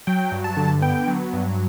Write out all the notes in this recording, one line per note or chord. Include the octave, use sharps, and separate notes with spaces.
F#3 G5
G2
A5
D3
B3 G5
F#3
G2